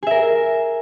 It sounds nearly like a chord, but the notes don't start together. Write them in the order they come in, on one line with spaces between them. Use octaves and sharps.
G#4 E5 A#4